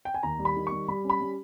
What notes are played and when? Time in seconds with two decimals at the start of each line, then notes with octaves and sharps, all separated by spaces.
0.05 G5
0.14 G#5
0.23 D#2 A#5
0.39 G3
0.45 B5
0.57 D#3
0.67 C#6
0.72 G3
0.88 G3 B5
1.04 C#4
1.10 B5
1.21 G3